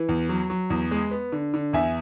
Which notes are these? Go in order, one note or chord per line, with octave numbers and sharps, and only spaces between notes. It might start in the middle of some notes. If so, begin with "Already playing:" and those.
Already playing: E3
E2
F#3
F#3
E2
G#3
B3
D3
D3
E2 E5 G#5